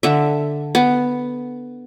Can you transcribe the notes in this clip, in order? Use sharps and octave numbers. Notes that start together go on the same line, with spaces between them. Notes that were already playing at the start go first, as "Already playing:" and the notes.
D3 E5
B3